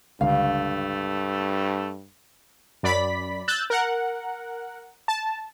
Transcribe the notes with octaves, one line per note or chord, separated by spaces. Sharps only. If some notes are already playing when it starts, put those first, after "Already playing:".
C#2 G2 D3 A3 F5
F#2 D5 B5 B6
E6 F#6 G6 A6
A#4 F#5
A5